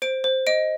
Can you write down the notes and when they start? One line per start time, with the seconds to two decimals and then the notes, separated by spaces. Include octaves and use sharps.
0.02 C5 D7
0.24 C5
0.47 D#5 D7